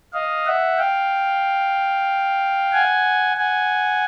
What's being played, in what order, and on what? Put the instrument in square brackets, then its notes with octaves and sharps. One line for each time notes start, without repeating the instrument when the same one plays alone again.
[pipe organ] D#5 F5
E5 F#5
F5 G5
F#5 G#5
F#5 G#5